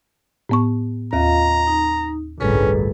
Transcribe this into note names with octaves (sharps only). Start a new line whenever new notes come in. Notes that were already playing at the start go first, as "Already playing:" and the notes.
A2 B3 C#6
D#2 F4 D#5 F5 A#5
D#4
G1 C2 A2 C#4 G#4 A4 B4